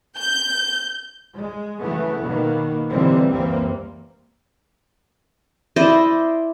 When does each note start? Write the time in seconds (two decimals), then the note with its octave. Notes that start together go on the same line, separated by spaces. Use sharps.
0.17 G6
1.35 G#3
1.80 C#3 E3 F#3 A3 B3
2.21 B2 D#3 A#3
2.89 B2 D3 E3 G3 A#3 C4
3.29 C#2 F#2 E3 G3 A#3 C4
5.76 E4 C5 D5 D#5